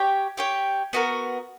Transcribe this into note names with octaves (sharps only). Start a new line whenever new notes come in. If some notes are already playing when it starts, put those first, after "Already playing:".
Already playing: G4 C#5 G5
G4 C#5 G5
B3 F#4 A#4